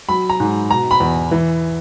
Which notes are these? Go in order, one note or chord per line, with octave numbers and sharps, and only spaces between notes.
F#3 B5
A#5
G#2
B2 A#5
B5
E2
E3